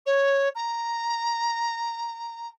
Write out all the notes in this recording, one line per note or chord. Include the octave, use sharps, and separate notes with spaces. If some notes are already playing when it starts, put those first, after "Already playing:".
C#5
A#5